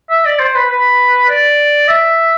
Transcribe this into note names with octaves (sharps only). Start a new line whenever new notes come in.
E5
D5
C5
B4
B4
D5
E5